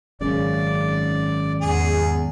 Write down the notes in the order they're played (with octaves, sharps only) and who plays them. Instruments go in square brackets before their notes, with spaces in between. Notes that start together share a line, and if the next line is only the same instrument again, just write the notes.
[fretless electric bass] G#1 F#2 C#3 [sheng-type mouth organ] D5
[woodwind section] E2 [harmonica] G#4